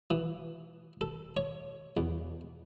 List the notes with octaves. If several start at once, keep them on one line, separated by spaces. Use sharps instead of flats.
E3
A4
C#5
E2